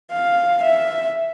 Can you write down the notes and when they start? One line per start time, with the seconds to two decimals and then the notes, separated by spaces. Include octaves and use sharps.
0.12 F5
0.63 E5